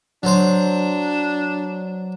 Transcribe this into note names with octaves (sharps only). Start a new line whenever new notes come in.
F#3 D4 C5